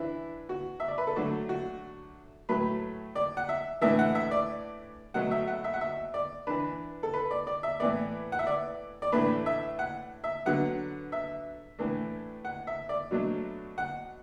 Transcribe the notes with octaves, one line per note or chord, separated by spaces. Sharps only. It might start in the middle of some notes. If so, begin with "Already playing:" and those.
Already playing: E3 D4 E4
F#4
E5
D5
B4
A4
D3 F#3 A3 D4 F#4
F#4
A2 F#3 A3 B4
D5
F#5
E5
A2 E3 A3 D4 E5
F#5
E5
D5
B2 F#3 A3 F#5
E5
F#5
E5
F#5
E5
D5
E3 D4 B4
A4
B4
D5
D5
E5
A2 E3 B3 D5
F#5
E5
D5
D5
A2 E3 A3 D4 B4
E5
F#5
E5
D3 F#3 B3 F#5
E5
A2 E3 A3 D4
F#5
E5
D5
B2 F#3 A3 D4
F#5